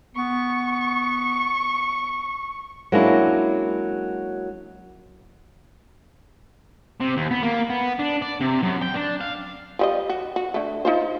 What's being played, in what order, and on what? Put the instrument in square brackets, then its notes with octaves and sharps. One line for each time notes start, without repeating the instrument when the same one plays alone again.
[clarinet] B3 [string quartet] C#6
[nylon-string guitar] F#3 G#3 A#3 C#4 D4 E4
[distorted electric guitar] C3
D#2
B3
A#3
B3
D4
D5
C3
F#2
G5
D4
F5
[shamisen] F3 G3 D#5
F#4
F#4
D3 A3
D#4 F4 C5